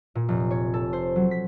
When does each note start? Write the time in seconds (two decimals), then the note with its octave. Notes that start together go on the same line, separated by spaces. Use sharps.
0.15 A#2
0.28 F1
0.51 C#5
0.74 A4
0.93 C5
1.16 F#3
1.31 B6